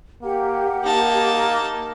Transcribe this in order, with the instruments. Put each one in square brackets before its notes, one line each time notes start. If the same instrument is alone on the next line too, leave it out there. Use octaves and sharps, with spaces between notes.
[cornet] A#3 [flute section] G4 F#5
[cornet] A#3 [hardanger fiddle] D#4 A5